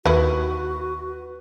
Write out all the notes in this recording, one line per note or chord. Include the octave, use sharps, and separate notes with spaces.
D#2 E3 E4 F#4 B4